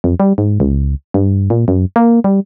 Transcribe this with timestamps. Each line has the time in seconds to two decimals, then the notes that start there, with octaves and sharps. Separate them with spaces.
0.04 F2
0.20 G3
0.38 G#2
0.60 C#2
1.14 G2
1.50 A#2
1.68 F#2
1.96 A#3
2.24 G3